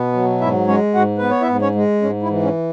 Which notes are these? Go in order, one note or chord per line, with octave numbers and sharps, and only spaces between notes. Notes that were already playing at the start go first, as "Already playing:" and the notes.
Already playing: B2 B3
F#3
G#2 E4 E5
G#3 C#4 C#5
G#2 F#4 F#5
B3 B4
C#5
E4 E5
G#2
C#4 C#5
G#3
G#2 C#4
E4
E3
C#4